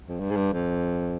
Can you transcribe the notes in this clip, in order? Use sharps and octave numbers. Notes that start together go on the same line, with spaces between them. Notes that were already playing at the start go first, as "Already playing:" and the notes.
F2
G2
G#2
G2
F2